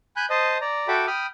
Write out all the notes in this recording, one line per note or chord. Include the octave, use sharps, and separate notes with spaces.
G#5 B5 F#6 G6
C5 D#5 A5 D#6
D5 A#5
F#4 A4 E5 G5 B5 D6
G5 B5 D#6 F6